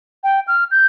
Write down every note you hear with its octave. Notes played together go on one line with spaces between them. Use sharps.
G5
F6
G6